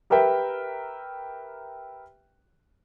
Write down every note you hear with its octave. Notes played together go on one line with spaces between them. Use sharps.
G4 A#4 B4 E5 G5